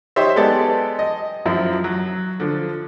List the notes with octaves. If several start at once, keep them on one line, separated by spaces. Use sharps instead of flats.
D#4 G4 C5 C#5 E5
G#3 B3 G4 A4 D5
D#5
F#2 F3 E4
F#3
D3 F3